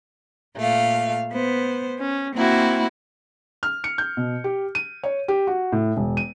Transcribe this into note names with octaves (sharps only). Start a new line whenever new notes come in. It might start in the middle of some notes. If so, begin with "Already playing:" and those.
A#2 A3 F5
B3 C5
C#4
A#3 C4 E4 F#4
F6
C#7
G6
B2
G4
D#7
C#5
G4
F#4
A2
E1
D#7